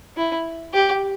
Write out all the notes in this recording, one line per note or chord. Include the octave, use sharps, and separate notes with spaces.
E4
G4